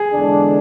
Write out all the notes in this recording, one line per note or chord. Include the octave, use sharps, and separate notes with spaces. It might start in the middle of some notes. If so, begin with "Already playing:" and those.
Already playing: G#4
E2 D3 G#3 D4